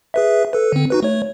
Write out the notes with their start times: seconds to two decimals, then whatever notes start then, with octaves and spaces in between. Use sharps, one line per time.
0.14 G#4 B4 E5
0.53 A4 B4
0.72 D3 C4
0.90 D#4 F#4 B4
1.03 A3 C#5